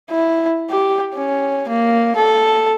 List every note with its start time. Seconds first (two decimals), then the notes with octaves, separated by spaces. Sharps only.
0.11 E4
0.70 G4
1.15 C#4
1.69 A#3
2.16 A4